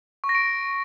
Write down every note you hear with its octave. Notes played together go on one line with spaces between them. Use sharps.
C#6
A#6
D7